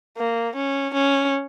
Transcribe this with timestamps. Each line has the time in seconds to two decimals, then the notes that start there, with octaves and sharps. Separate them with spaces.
0.17 A#3
0.55 C#4
0.94 C#4